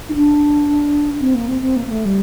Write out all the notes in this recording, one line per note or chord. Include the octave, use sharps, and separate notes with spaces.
D#4
D4
C4
A#3
C4
C4
A#3
A#3
A3
G3